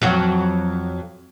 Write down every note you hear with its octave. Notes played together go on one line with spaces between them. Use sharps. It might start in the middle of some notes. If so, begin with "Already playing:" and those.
F2 F#3 F#4